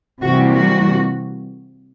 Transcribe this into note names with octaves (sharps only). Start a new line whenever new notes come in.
C3 E3 G3 A#3 F#4
F#4